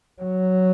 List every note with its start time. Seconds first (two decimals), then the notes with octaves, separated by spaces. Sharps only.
0.22 F#3